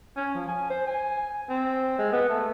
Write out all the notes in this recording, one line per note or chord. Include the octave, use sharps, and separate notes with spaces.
C#4
F3
G#5
C5
G#5
C4
G#3
B3
A3